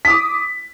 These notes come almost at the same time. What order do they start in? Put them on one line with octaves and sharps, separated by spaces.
B6 D#6 D6